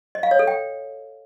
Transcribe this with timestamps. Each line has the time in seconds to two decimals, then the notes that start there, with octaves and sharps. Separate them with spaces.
0.15 D#5
0.23 F5
0.31 C#5
0.39 A4
0.47 G5